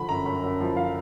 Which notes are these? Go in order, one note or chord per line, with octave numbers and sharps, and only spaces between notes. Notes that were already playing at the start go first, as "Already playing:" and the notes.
Already playing: D3 F3 B5
F#2 A#5
F#2 B5
F#2
F3
F3 F5